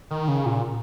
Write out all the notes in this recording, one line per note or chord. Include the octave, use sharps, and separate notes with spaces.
D#3
C#3
A#2